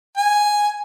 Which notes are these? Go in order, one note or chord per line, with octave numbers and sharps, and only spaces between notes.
G#5